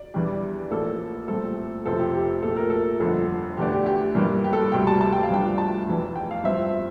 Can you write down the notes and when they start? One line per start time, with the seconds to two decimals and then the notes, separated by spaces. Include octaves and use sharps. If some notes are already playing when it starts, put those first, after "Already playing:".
Already playing: D5
0.14 E2 E3 G3 D4
0.71 A1 A2 F3 A#3 A4
1.28 C2 A#2 A3 C4 A4
1.86 F1 F2 C3 F3 C4 A4
2.00 G4
2.15 G4
2.43 A#1 A#2 A3 A4
2.57 A#4
2.70 A4
3.00 G1 F2 D3 A4
3.57 E2 D3 A3 D4 G4
3.73 G4
3.86 G4
4.15 G1 G2 E3 G3 A#3
4.44 G4
4.53 A4
4.72 D2 C3 G3 G5
4.87 A5
5.01 A5
5.13 G5
5.23 F5
5.30 G2 F3 A3 D4 G5
5.58 A5
5.87 F1 E2 E3
6.16 G5
6.31 F5
6.44 G2 F3 C4 E5